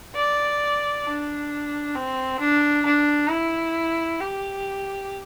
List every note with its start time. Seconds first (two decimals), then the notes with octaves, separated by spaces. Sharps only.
0.15 D5
1.05 D4
1.95 C4
2.40 D4
2.85 D4
3.30 E4
4.21 G4